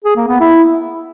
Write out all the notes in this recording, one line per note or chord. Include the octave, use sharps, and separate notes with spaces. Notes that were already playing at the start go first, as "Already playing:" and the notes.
G#4
A#3
B3
E4